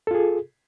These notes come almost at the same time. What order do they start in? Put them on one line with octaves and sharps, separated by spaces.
A4 F4 G#4